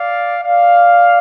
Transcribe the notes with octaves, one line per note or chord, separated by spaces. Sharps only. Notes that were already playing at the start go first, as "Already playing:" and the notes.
Already playing: D5 F5
D5 F5